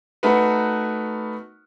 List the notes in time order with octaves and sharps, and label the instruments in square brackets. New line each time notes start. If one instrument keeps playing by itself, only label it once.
[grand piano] A3 B3 D#4 F#4 A#4 B4